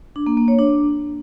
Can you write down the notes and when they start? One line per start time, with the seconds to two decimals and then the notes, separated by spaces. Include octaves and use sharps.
0.16 D4
0.26 A#3
0.37 A#3
0.48 C#5
0.59 D4